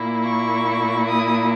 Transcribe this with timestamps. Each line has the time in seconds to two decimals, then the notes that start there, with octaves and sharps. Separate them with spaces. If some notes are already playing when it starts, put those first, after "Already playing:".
Already playing: A#2 A#3 E4
0.24 C#6
1.08 D#6